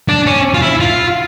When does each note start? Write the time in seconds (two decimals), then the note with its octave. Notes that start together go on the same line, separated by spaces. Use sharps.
0.09 D4
0.26 C#4
0.54 F4
0.62 E4
0.80 F4